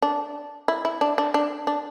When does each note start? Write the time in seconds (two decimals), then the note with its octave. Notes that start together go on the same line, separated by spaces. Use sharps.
0.02 D4
0.68 E4
0.85 E4
1.01 D4
1.18 D4
1.34 D4
1.67 D4